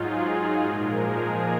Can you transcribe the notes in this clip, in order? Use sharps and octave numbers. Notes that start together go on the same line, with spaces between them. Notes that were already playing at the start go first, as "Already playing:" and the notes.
Already playing: G#2 F#3 D#4 F4 G#4
A#2 F3 G#3 A#4
G#4